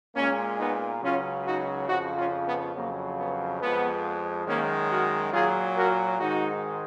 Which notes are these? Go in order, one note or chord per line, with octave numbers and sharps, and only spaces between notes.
A#2 G#3 A#3 C#4
B3 D#4
C#2 C#3 F#3 C#4 F4
D#4 F#4
F2 C#3 F3 D#4 F#4
C#4 F4
B3
F2 C#3 F#3 A#3
B3
F2 F3 G#3 B3
F#2 D#3 G#3 A#3 C#4
F#4 A#4
A#2 F#3 F4 G#4
F#4 A#4
G#2 D#3 G#3 D#4 F#4